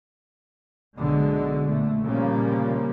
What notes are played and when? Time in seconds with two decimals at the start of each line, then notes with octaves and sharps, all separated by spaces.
0.97 B1 B2 D3 G#3
1.68 A#1 A3
2.03 A#2 C#3 F3 G3 A#3